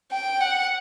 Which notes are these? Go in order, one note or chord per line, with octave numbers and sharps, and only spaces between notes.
G5
F#5